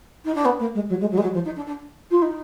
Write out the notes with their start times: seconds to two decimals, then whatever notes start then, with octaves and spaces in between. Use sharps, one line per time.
0.25 D#4
0.35 D4
0.45 B3
0.59 A#3
0.74 G#3
0.89 F#3
1.00 G#3
1.11 F#3
1.17 G#3
1.23 F#3
1.33 F3
1.45 D#4
1.56 D4
1.66 D4
2.11 F4
2.22 D#4